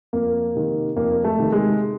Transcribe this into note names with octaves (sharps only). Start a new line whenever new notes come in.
F2 A#3
C3 D#3
F2 A#3
A3
C3 D#3
G#3